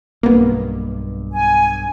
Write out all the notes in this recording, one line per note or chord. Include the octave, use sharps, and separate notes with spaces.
B1 G2 A#3 B3
G#5